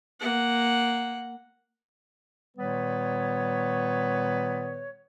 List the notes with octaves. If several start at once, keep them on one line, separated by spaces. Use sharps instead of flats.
A#3 F#5
A#2 D#3 G3 B3 B4 C#5